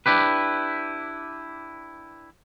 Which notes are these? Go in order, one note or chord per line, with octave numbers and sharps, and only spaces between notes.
D4 E4 G4 B4